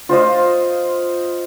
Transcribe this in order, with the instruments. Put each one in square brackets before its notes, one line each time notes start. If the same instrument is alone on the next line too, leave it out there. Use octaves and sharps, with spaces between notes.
[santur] F4 C5 D#5 F5